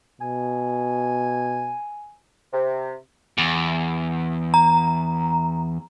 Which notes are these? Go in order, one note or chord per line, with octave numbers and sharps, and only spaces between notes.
B2 G#5
C3
E2
A#5